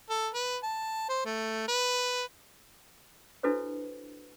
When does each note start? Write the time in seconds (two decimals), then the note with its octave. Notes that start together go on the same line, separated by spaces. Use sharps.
0.10 A4
0.34 B4
0.63 A5
1.09 C5
1.25 A3
1.68 B4
3.43 D4 E4 F#4 A4 B4 C5